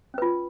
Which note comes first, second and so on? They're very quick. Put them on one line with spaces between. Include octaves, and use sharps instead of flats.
C#4 B4 F4